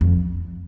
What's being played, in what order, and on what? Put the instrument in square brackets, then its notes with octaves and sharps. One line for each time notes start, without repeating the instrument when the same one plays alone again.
[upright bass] F2